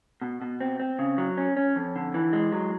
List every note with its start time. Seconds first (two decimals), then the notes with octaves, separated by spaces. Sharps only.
0.22 B2
0.42 B2
0.61 C4
0.80 C4
0.99 C#3
1.18 F#3
1.37 C#4
1.57 C#4
1.76 F2
1.96 D3
2.14 E3
2.33 G#3
2.52 F#3